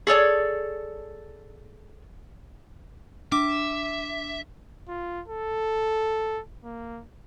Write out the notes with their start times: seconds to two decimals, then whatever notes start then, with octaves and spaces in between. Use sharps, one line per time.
0.07 G#4 A4 C#5 D5
3.32 D4 E5 D6
4.88 F4
5.28 A4
6.64 A#3